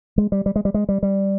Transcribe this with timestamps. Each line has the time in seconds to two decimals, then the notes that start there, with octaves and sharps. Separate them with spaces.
0.18 G#3
0.32 G3
0.46 G3
0.56 G#3
0.65 G3
0.74 G#3
0.89 G3
1.03 G3